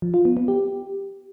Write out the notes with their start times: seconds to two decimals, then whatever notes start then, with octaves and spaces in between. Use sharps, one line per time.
0.02 F3
0.14 F4
0.25 B3
0.37 B3
0.48 G4